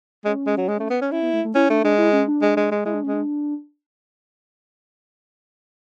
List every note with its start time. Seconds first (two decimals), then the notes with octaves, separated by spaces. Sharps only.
0.25 G#3 C#4
0.46 G#3
0.57 F#3
0.68 G#3
0.80 A3
0.90 B3
1.01 C#4
1.12 C#4 E4
1.22 B3
1.33 A3
1.45 A3
1.55 C#4 E4
1.70 A3 D4
1.83 G#3 D4
1.98 E4
2.13 C#4
2.28 D4
2.42 G#3
2.57 G#3
2.71 G#3
2.85 G#3 E4
2.94 D4
3.03 G#3 C#4
3.13 D4